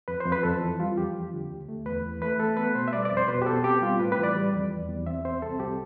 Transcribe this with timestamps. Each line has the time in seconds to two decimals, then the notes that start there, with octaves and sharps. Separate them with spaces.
0.08 F2 B4
0.20 C5
0.26 F2
0.32 B4
0.43 F2 A4
0.61 E3
0.80 G3 F4
0.97 F2 G4
1.15 F3
1.33 D3
1.51 D2
1.69 A3
1.86 E2 B4
2.04 E3
2.22 A3 B4
2.39 A3 A4
2.57 B3 B4
2.75 B2 C5
2.88 E5
2.93 G3 D5
3.05 D5
3.11 F2
3.17 C5
3.28 B2 B4
3.42 G4
3.46 B3 A4
3.64 C4 G4
3.82 G3 F4
4.00 A2 B4
4.12 B4
4.18 E3
4.23 D5
4.36 G3
4.54 F2
4.71 E2
4.89 E2
5.06 C4 E5
5.25 C4 C5
5.42 C2 A4
5.60 C2 G4